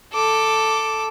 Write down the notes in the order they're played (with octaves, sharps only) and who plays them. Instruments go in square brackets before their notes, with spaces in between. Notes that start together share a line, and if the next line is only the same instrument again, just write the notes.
[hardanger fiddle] A4 D6